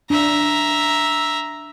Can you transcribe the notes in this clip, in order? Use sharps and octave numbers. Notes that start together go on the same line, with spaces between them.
D4 E5 A#5